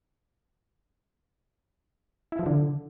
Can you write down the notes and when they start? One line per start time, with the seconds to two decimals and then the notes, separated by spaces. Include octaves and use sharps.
2.32 E4
2.39 F3
2.46 D3